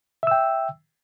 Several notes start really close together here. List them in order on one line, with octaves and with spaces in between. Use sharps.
E5 E6 G5